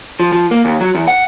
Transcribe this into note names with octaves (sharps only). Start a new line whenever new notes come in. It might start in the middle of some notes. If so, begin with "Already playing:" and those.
F3
F3
A#3
D#2
F#3
E2
F#5